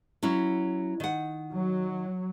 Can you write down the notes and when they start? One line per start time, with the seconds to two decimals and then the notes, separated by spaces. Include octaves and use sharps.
0.23 F#3 C#4 E4
1.00 D#3 F#5
1.51 F#3